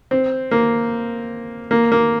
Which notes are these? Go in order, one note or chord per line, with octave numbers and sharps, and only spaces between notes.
C4
A#3
A#3
A#3